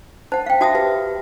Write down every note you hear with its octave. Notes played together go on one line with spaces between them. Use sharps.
C5 F#5 A5
F5 G5
F#4 E5 A5 D#6 A#6
G4 B4